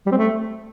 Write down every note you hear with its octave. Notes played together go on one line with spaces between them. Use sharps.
G3
C4
A3